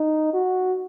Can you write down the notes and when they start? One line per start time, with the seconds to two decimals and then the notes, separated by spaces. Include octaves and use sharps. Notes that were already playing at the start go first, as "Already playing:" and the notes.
Already playing: D#4
0.34 F#4